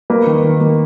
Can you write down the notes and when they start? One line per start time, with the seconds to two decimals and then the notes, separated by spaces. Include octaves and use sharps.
0.10 A#3 B4
0.27 D#3
0.43 D#3
0.60 A#3